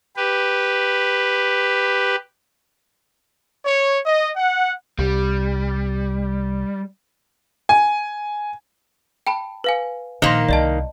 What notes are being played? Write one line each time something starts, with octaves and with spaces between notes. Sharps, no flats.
G4 B4
C#5
D#5
F#5
C2 G3
G#5
G5 A5 B5
B4 F5 G#5
A#1 D#3 A#3 C5 C6
C2 D5 D#5 A5